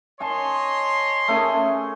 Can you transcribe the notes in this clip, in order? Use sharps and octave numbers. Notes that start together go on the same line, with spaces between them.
C#5 D#5 G#5 A5 C6
A3 C#4 G#4